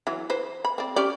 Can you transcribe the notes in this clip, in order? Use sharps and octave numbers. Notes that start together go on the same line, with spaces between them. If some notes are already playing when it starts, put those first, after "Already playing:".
E3 F#3
B4 C5
B5
C4 D5
C#4 G4 D5